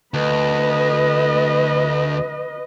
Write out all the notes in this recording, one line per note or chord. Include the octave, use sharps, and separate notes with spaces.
D2 B4 D#5